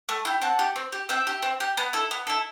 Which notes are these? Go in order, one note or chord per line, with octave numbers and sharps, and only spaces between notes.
A3
E4 G4
C4 F#5 A5
G4
C4
G4
C4 E5 G5
G4
C4
G4
B3
E4 A4
B3
E4 A4